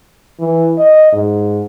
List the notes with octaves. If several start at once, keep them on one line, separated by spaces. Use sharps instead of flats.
E3
D#5
G#2